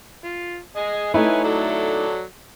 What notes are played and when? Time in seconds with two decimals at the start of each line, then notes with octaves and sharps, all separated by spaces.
0.24 F4
0.76 G#4 D#5 G#5
1.14 A3 D#4 E4 B4 C#5 G#5
1.44 F#3 A4 D5